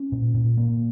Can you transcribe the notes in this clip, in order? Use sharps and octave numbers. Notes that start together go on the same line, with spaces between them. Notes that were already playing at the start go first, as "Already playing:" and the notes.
Already playing: C#4
A#2
A#2
A#3